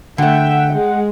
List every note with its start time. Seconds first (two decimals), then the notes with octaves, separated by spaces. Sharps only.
0.18 D3 A3 E5 F#5 G5
0.73 G#3